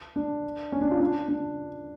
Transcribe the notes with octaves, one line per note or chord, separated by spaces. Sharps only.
D4
C#4
D4
F4
D4
D4